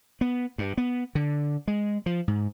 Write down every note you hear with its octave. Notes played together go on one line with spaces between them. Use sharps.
B3
G2
B3
D3
G#3
F3
G#2